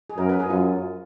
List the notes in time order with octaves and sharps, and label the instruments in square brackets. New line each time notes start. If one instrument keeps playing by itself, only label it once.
[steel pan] G#4
[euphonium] F#2 [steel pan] A#4
[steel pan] B4
G#4
[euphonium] F#2 [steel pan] F4